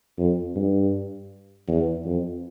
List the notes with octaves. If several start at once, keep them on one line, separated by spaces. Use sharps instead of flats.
F2
G2
E2
F2